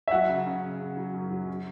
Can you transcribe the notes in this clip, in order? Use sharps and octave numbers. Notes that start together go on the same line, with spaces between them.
E5
F#3 F#5
C#3
C#4
C#3
C#3
F#3
F#2
F#3
C#4